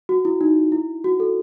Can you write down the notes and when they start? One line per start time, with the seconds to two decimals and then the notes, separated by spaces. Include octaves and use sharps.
0.09 F#4
0.25 E4
0.41 D#4
0.72 E4
1.04 F#4
1.20 A4